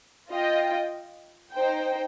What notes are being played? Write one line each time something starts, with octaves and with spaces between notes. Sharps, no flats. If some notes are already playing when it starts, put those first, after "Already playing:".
F4 D#5 G5
D#4 C5 G5